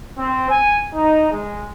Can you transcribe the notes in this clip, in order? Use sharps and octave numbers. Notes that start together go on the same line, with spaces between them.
C4
G#5
D#4
G#3